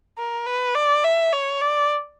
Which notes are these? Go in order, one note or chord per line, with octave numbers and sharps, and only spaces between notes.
A#4
B4
D5
E5
C#5
D5